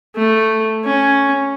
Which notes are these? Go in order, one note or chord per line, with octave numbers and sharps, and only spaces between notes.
A3
C#4